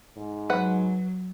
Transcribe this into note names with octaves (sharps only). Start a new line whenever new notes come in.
G#2
F#3 B4 F#5